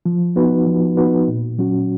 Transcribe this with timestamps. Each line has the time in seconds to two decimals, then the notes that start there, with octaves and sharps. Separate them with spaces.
0.06 F3
0.36 B3 D#4 F#4 B4
0.67 F3
0.97 B3 D#4 F#4 B4
1.28 A#2
1.58 F#3 C#4 F#4